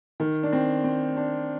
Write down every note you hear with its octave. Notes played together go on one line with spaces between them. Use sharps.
D#3
D4
C4
C4
D4